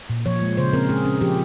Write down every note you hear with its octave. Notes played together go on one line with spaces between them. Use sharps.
A#2
F3 C#5
G#3
C#3 C5
C4 A#4
G#3 G#4
C#4
F3 G4